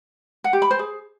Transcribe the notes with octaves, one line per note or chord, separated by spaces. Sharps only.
F#5
G4
B5
C5
G#4